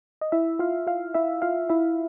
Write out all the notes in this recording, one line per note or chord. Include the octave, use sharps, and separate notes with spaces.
D#5
E4 E5
F4 F5
F4 F5
E4 E5
F4 F5
E4 E5